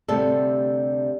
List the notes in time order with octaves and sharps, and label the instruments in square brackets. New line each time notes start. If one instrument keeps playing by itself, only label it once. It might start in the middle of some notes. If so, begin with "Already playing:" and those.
[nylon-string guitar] D2 C3 G3 A3 A4